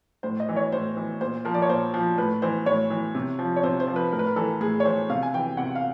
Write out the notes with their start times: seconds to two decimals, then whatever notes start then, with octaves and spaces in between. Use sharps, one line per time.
0.23 A2 C5
0.40 D#5
0.49 E3
0.56 C#5
0.72 A2 C5
0.96 E3
1.21 A#2 C5
1.45 F3 A#4
1.54 D5
1.62 C#5
1.69 A#2 C5
1.94 F3
2.18 A2 B4
2.42 E3 C5
2.66 A2 C#5
2.90 E3
3.15 C3
3.39 F3
3.56 C#5
3.63 C3 C5
3.80 C5
3.87 F3
3.96 B4
4.12 A2 A#4
4.19 B4
4.26 A#4
4.36 E3 A4
4.61 A2 G#4
4.80 C#5
4.85 E3 C5
5.09 C3 F5
5.23 G#5
5.34 E3 G5
5.57 C3 F#5
5.75 F5